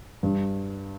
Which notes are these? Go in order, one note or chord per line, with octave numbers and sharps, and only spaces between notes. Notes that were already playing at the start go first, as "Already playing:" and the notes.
G2